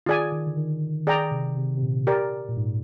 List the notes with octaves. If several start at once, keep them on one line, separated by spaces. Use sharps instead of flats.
D#3 F4 G#4 D5 G#5
D#3
D3
D#3
D#3 G#4 D5 G5 A#5
C3
C3
C3
A#2
G4 A#4 D5
A#2
G#2